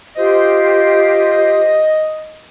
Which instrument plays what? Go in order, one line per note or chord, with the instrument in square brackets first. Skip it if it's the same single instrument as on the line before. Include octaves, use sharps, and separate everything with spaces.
[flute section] F4 G4 C5 [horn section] D#5